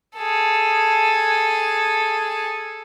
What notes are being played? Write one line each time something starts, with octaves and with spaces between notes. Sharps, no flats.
G#4 A4